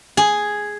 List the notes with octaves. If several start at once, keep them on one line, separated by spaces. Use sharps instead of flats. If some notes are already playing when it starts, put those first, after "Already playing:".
G#4